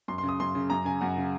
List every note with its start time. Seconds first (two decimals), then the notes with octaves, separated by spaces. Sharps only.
0.08 F#2 C6
0.18 C6
0.23 C#3
0.29 D#6
0.40 F#2 C6
0.55 C#3
0.70 F#2 A#5
0.85 C#3 G#5
1.01 F#2 F#5
1.17 C#3